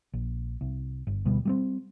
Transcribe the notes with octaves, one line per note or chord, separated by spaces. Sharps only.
A#1
C2
G1
D2 B2 G3 B3
G3 A3 C4